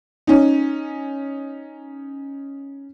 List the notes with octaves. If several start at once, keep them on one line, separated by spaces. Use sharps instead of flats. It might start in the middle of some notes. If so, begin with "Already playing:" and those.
C#4 D#4